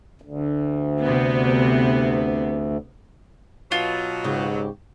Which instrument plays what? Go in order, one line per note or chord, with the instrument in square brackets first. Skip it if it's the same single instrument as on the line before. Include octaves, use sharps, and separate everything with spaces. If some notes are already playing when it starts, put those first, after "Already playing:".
[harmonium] D2
[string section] C3 B3
[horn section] B2 F#3 [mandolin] F4
[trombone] G#2 [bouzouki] C#3 G4